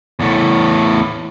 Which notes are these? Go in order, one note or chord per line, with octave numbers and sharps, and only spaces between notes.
E2 A2